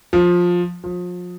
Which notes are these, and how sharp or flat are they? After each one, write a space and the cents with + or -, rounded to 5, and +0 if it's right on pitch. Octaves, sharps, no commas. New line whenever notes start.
F3 +15
F3 +35